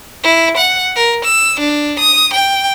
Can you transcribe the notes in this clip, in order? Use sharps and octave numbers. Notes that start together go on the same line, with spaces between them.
E4
F#5
A#4
E6
D4
D#6
G5